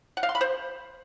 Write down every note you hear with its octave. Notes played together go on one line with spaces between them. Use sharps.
F#5
F5
C6
B5
C5